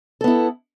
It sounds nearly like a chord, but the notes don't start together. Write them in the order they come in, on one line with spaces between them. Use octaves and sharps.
A4 B3 E4